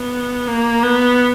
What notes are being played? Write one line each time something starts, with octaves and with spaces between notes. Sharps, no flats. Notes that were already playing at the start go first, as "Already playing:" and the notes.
Already playing: B3
A#3
B3